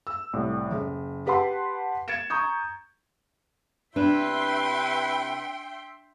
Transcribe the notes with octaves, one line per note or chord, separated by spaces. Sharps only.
E6
C2 A2
F#1
G4 B4 F#5 A5 C6
G#6 A6 C#7 D7 E7
A#5 C#6 D#6 G6
C3 D4 E4 B4 E5 G5 C6